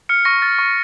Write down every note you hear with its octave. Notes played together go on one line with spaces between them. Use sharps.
F6 C#7
C#6 A#6
F6 A6
C#6